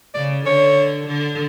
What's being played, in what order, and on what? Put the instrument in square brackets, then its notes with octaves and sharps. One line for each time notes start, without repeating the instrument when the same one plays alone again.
[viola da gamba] C#3 [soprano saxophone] D5
[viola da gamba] D3 [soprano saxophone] C#5
[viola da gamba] D3